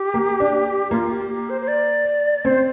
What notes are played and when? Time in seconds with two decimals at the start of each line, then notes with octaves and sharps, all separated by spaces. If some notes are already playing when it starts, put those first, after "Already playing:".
Already playing: G4
0.14 A#3
0.40 D4
0.91 A#3 F4
1.11 G4
1.30 G4
1.50 C5
1.61 C5
1.68 D5
2.45 C4 C5